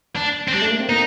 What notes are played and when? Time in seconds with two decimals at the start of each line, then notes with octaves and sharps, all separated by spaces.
0.16 D4
0.48 C4
0.52 G3 D4
0.62 A3
0.71 A#3
0.80 C4
0.89 A#3 D#4